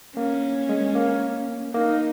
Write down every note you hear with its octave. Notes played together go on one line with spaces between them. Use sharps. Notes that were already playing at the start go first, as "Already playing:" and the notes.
A#3 C#4
G#3
A#3
A#3 D#4